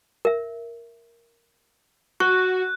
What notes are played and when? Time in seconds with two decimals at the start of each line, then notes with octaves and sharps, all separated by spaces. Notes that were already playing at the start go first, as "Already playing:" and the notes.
0.25 A#4 E5
2.20 F#4 C#6 F#6